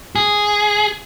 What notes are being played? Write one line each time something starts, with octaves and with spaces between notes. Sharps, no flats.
G#4